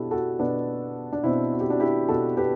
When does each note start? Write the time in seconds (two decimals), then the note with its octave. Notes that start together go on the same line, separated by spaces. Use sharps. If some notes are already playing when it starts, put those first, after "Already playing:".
Already playing: B2 D4 E4 F#4 G4 A4
0.11 F#4 A4
0.39 B2 B3 D4
1.13 D4
1.23 B2 C4 E4
1.52 F#4
1.60 G4
1.70 D4 F#4
1.80 E4 G4
2.09 B2 F#4 A4
2.37 G4 B4